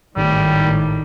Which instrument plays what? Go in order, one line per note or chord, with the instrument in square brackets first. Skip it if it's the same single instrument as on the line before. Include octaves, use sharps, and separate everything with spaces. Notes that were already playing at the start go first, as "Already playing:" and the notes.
[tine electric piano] G#1 [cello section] A2 D#3 [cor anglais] G3